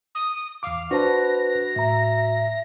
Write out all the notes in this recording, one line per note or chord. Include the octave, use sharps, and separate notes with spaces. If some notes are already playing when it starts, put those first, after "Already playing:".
D#6
E2 F5 D6
D4 F#4 B4 C5 A5 A#6
A2 E5 A#5